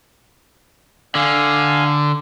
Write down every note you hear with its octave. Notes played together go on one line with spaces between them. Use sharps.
D3 F5 G#5